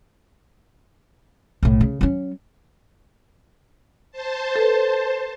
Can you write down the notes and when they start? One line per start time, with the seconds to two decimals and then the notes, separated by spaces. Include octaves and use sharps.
1.63 B1 A2
1.81 C#3
2.01 F#3 C#4
4.12 C5 A5
4.56 A4 B4